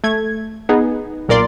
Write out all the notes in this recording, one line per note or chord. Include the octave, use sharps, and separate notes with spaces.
A3 G#6
B3 D#4 G#4
B1 A#2 A#4 D5 C6